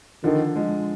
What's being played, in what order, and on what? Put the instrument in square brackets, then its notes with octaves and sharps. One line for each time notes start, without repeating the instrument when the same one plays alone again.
[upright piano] D3 F3 [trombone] D#3
[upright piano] F3 G#3